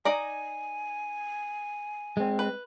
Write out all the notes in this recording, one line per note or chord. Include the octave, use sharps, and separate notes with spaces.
D#4 D5 G#5 A#5
G#3 C4
B4